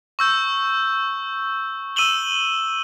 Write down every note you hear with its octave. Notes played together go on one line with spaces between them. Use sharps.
C#6 E6 G6
E6 D#7 E7 F#7 G7